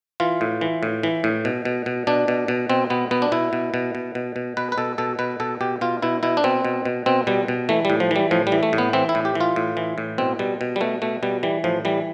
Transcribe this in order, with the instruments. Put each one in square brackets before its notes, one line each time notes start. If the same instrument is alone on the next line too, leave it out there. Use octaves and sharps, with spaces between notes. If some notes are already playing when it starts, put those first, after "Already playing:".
[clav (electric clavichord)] E3 F4
A2
E3
A2
E3
A2
B2
B2
B2
B2 D4
B2
B2
B2 C4
B2 B3
B2 B3
D4
B2 E4
B2
B2
B2
B2
B2
B2 B4
B4
B2 A4
B2 A4
B2 B4
B2 A4
B2 G4
B2 F4
B2 E4
B2 E4
D4
B2 C4
B2
B2
B2 C4
B2 G3
B2
E3 A3
A2 G3
F3
E3 G3
A2 F3
G3
E3
A3
A2
B3
E3 C4
E4
A2
G4
E3
F4
A2
E3
A2
B2 C4
B2 G3
B2
G3
B2 A3
B2 A3
B2 G3
E3 G3
A2 F3
E3 G3